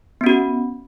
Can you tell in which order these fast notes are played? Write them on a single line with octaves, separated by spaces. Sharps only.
B3 C#4 F#4